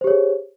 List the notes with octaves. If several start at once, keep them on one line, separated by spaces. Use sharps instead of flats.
G4 G#4 C5 C#5